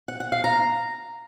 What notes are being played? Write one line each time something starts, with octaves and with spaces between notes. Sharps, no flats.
F#5
F#5
F5
A#5